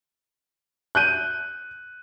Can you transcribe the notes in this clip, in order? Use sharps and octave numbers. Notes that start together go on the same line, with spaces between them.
F#6 G6 D#7